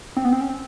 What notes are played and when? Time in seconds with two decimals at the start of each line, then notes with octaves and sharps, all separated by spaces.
0.17 C4
0.25 B3
0.33 C4
0.41 C#4
0.49 C4